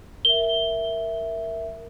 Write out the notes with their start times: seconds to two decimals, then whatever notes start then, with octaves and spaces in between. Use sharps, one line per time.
0.25 A#4 E5 G7